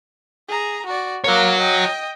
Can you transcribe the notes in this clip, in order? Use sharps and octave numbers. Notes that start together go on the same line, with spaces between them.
G#4 A#5
F#4 D5
A#3 F#4 C#5 D6
D#5 G5